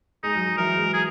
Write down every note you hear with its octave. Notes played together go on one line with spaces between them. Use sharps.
G#3 D#4
F#3
F#3
E3 A#4
G#3
G#4